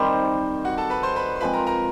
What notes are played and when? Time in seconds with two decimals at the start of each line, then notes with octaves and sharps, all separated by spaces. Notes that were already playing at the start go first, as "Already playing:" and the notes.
Already playing: D#3 G3 C4 C5 C6
0.65 F#4 F#5
0.78 A4 A5
0.90 B4 B5
1.03 C5 C6
1.16 B4 B5
1.36 C6
1.41 F3 G#3 C4 B4 B5
1.53 A#4 A#5
1.67 A#4 A#5